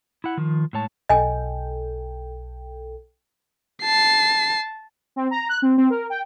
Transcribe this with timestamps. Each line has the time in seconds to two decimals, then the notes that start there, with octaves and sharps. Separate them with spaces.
0.24 E4 F#5
0.37 D#3 F3
0.73 A2 G#3 C#5 A5
1.09 B1 A4 D#5 G5 G#5
3.83 A5 C7
5.16 C4
5.31 A#5
5.49 F#6
5.62 C4
5.78 C4
5.90 A#4
6.10 G5